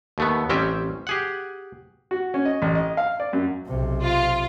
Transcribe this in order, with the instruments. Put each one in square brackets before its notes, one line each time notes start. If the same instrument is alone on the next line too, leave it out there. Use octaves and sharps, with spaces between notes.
[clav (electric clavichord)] D#2 A3 B3
A1 G3 C4 C#4 E5 G5
G4 G#4 F#5
[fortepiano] F#4
C#4
D#5
A1
D#5
F5
D5
F#2
[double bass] B1 C3
[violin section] F4